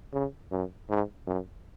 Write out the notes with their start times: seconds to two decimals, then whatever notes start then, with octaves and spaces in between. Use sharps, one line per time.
0.14 C#3
0.52 F#2
0.90 G#2
1.27 F#2